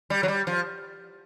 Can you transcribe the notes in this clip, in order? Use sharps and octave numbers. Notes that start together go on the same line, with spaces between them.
G3
F#3
G3
F3